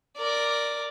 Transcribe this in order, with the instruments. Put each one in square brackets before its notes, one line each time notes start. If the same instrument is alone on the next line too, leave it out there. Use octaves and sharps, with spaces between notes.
[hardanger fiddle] A#4 D5